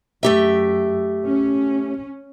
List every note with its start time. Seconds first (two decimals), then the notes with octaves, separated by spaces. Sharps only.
0.23 F#2 A3 G4 E5
1.25 C#4